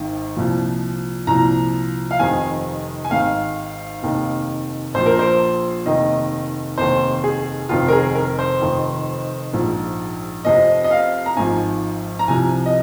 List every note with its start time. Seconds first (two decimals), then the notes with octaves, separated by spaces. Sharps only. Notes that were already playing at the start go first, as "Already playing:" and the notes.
Already playing: G#1 G#2 D#3
0.37 C2 A#2 F3
1.27 C2 A#2 F3 A#5
2.11 F5
2.19 F1 F2 C3 D#3 G#5
3.05 G#5
3.11 G#1 G#2 D#3 F5
4.03 F1 D#2 D#3
4.94 A#1 A#2 F3 C5
5.06 A#4
5.19 C5
5.86 F1 D#2 D#3 D#5
6.78 F1 D#2 D#3 C5
7.24 G#4
7.69 F1 F2 D#3 F4
7.88 A#4
7.92 G#4
8.15 A#4
8.39 C5
8.61 F1 F2 D#3
9.53 A#1 G#2 F3
10.45 F1 F2 C3 F3 D#5
10.84 D#5
10.91 F5
11.26 A#5
11.37 G#1 G#2 F3 G#5
12.19 A#5
12.28 C2 C3 F3 G#5
12.66 D#5